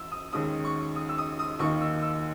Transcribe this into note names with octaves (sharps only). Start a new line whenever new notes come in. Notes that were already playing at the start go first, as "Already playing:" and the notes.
Already playing: F#2 E3 E6
D#6
D#2 D#3 G#3 C#4 D#6
C#6
D#6
E6
D#6
D#6
D#2 D#3 A#3 D#4 C#6
E6
E6